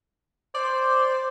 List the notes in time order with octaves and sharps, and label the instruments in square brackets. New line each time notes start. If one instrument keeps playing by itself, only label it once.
[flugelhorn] C5 [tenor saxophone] D5